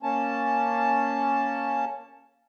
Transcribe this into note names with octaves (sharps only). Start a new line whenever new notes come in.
A#3 C#4 A5